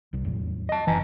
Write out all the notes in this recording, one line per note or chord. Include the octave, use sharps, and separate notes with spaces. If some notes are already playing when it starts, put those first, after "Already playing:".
C2 C3 G3
E2 A2 F#3
D#5 A5
F#1 E3 G#5 A#5